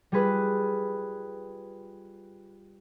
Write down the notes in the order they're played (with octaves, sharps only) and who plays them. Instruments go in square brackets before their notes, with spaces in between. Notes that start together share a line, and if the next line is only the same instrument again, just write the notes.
[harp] G3 F4 G#4 B4